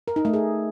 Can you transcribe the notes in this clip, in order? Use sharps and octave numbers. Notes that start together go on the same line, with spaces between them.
A#4
D#4
A3
G#4